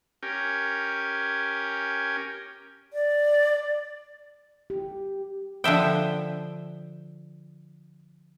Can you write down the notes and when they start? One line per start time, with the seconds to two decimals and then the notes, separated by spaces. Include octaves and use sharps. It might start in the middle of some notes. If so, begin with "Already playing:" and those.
0.23 C#4 G4 A#4 G5 G#5
2.93 D5
4.70 G4
5.64 D3 F3 E5 G5